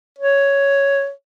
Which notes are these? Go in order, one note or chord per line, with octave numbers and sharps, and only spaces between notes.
C#5